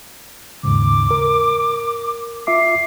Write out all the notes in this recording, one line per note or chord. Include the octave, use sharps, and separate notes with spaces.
D#2 G#2 C#3 D6
A#4
F4 E5 D6 C7